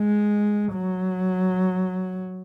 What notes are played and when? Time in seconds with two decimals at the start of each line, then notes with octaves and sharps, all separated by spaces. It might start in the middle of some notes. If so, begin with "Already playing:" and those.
Already playing: G#3
0.73 F#3